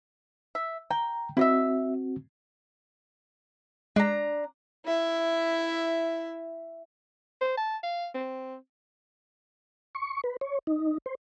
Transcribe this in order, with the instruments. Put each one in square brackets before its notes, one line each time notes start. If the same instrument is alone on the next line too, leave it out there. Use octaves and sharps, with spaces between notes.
[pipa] E5
[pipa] G5 [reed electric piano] A#5
[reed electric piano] C4 F#4 [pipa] E4 D#5 E5
[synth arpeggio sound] G#3 [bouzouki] D4 A#5
[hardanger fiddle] E4 E5
[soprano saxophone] C5
A5
F5
C4
[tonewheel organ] C#6
B4
C#5
D#4
C5